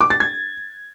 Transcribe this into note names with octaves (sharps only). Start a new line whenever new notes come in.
D6
A6
G#6